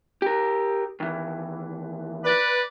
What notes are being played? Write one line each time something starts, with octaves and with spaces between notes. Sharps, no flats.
G4 A#4
D#2 E3
B4 D5